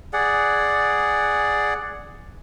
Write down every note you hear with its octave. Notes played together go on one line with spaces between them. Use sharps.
G#4 D5 F#5